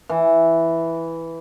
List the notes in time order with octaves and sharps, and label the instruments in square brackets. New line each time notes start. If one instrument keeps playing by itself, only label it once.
[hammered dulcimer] E3